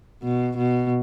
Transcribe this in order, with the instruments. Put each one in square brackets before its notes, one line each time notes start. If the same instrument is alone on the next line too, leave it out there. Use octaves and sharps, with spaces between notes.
[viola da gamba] B2
B2